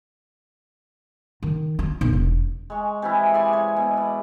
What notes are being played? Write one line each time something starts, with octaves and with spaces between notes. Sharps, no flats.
D#3
F4
B1
E1
G#3 C#6
C3 E3 E4
G#4 D5 G#5 C6
C#5
B2
B4 D5